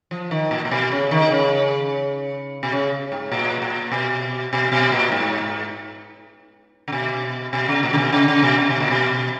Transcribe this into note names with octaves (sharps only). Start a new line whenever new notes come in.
F3
D#3
A#2
A#2
B2
C#3
D#3
C#3
B2
C#3
G#2
A#2
A#2
B2
B2
B2
A#2
G#2
C#3
B2
B2
C#3
A#2
C#3
B2
C#3
C#3
B2
C#3
B2
A#2
B2